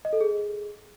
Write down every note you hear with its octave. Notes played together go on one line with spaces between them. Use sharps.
D#5
A4
G#4